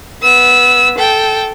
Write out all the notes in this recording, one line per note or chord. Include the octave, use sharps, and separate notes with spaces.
B3 E6
A4 G5